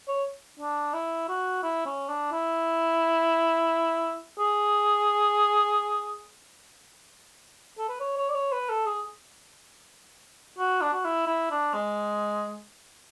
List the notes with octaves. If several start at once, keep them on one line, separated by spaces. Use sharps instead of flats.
C#5
D4
E4
F#4
E4
C#4
D4
E4
G#4
A4
B4
C#5
C#5
D5
C#5
B4
A4
G#4
F#4
D4
F#4
E4
E4
D4
G#3